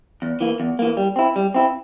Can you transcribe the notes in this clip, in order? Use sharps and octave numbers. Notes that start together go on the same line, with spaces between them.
E2
E3 A#3
E2
E3 A#3
G3
C4 E4
G3
C4 E4